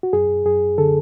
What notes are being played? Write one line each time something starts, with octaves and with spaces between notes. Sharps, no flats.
F#4
F#2 G#4
F#2 G#4
D3 A4